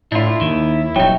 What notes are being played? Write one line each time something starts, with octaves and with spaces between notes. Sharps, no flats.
A2 D4 E4 F4
D#2 D#3
D#1 F#3 D#4 C#5 E5 G5